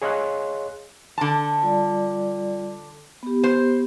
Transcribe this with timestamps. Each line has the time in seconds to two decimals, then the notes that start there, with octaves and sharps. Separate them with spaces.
0.02 G#4 C#5 D#5 F5 C6 F#6
1.18 D3 A5
1.62 G3 F4 D5
3.23 B3 G4
3.44 C5